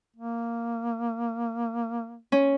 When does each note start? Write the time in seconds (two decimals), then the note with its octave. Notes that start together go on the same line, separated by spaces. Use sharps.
0.16 A#3
2.32 C#4